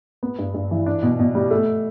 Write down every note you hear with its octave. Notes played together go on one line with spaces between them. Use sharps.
B3
G2
G2
E3
D4
B2
B2
G3
A3